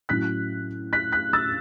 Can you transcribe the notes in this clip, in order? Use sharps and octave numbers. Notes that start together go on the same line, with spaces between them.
A2 F#3 C#4 E4 F#6 B6
F#6 B6
F#6 B6
E6 A6